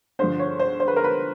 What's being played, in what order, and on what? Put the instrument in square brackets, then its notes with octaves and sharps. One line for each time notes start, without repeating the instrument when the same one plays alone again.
[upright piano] G2 D3 F3 C5
C#5
C5
C5
B4
A#4
B4